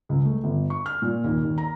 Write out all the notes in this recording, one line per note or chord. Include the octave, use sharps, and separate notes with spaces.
C#2
A3
G1
C#6
F6
A#2
D#2
D#2
A#5